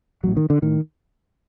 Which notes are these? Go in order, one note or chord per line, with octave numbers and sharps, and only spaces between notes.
A1 A2 F#3
D#3
D3
A2 D#3